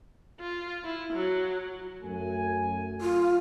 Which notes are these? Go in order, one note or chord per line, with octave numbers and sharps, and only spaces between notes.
F4
E4
F#3
F#2 A3 G#5
F4